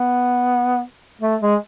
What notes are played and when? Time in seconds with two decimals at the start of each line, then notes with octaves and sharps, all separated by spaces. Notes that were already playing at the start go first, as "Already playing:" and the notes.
Already playing: B3
1.21 A3
1.41 G#3